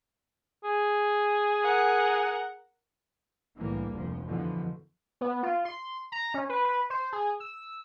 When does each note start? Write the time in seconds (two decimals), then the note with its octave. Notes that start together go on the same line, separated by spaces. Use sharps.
0.64 G#4
1.63 A#4 F#5
3.57 C2 A2 D3 E3 G3 A#3
3.91 F1 D2 F3
4.27 F#2 B2 D3 E3 F3
5.21 B3
5.43 F4
5.65 C6
6.12 A#5
6.34 C#4
6.49 B4
6.65 B4
6.90 C5
7.12 G#4
7.40 E6